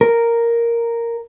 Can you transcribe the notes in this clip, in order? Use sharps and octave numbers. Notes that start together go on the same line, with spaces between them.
A#4